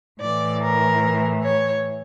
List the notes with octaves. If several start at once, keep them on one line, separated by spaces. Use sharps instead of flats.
A2 E3 D5
A#4
C#5